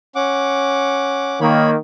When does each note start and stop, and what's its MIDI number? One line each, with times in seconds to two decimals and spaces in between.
0.15 1.40 61
0.15 1.40 78
0.15 1.40 86
1.41 1.76 51
1.41 1.76 58
1.41 1.70 73
1.41 1.70 83